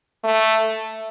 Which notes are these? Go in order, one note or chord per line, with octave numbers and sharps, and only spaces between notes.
A3